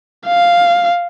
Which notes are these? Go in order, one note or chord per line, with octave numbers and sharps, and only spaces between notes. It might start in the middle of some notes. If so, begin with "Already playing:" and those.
F5